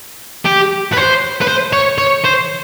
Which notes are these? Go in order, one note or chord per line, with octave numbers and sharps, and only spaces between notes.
G4
B4
C5
B4
C5
C#5
C#5
C5